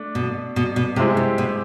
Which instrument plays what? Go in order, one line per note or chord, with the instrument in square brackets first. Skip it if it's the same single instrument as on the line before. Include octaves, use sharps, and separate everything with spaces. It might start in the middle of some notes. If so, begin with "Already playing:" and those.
Already playing: [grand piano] A3 D4
[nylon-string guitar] B2
B2
B2
[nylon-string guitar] C3 [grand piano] G#3 C4 E4 G4
[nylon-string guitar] C3
B2